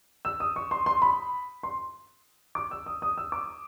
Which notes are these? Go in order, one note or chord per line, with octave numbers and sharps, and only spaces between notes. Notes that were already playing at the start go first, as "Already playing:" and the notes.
E6
D#6
C#6
C6
C6
B5
C6
D6
E6
D#6
D#6
E6
D6